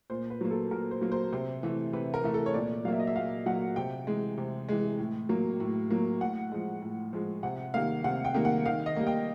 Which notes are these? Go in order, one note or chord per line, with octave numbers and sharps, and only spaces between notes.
A#2 C5
B4
F#3 A#3
A4
A#2 A#4
C5
F#3 A#3
C5
C3 C5
E3 A3
C3 B4
A#4
E3 A3
A4
C#5
A#2 D5
F#3 A#3 E5 F5
D#5
E5
A#2 F5
F#3 A#3 F#5
C3 G5
E3 G#3
C3
E3 G#3
A2
F#3 A#3
A2
F#3 A#3
A2 F#5
F3 G#3
A2
F3 G#3
C3 F#5
D#3 G3 A#3 F5
C3 F#5
G5
D#3 G3 A#3
F#5
D#3 F5
D#5
G3 A#3
G5